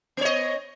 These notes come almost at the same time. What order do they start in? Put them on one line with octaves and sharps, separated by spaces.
B3 C#5 D#5